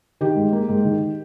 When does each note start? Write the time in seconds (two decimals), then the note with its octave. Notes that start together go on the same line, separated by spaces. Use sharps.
0.21 D#3 G4
0.36 G#2
0.53 A#3
0.69 G#2
0.85 D#3